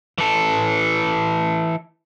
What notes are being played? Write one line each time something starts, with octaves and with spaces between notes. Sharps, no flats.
E3 A4